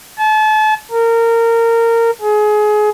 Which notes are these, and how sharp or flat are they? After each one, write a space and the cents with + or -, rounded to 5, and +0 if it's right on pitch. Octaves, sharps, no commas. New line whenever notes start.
A5 -35
A#4 -20
G#4 +25